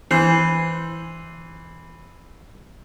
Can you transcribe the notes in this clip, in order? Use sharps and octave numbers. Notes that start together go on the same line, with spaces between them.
E3 C5